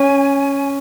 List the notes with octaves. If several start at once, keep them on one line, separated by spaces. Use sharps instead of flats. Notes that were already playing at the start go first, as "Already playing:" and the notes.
Already playing: C#4 G#5